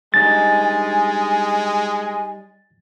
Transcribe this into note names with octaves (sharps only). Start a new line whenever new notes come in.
G3 G#3 D4 D#4 G#5 A6